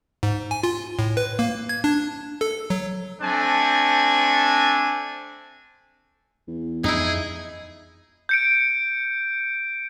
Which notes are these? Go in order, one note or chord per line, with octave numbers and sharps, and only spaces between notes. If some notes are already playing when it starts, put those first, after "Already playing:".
G#2
G#5
F4
A2
B4
A#3
G#6
D4
A4
F#3
A3 C4 D4 G#5
E2
F2 D#4 E4 G#4
G6 C#7 D7